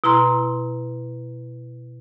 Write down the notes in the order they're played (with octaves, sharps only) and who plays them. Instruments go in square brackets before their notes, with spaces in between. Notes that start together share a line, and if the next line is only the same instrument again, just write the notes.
[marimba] B2 E4 A#5 C6